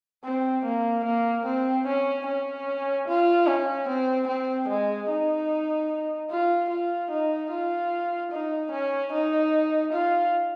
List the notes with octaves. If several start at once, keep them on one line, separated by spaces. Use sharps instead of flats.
C4
A#3
A#3
C4
C#4
C#4
F4
C#4
C4
C4
G#3
D#4
F4
F4
D#4
F4
D#4
C#4
D#4
F4